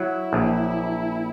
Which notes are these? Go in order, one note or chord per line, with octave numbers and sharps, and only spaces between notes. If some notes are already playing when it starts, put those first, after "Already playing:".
Already playing: F#3 E4
A#1